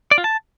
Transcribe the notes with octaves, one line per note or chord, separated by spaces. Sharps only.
D5
F4
A5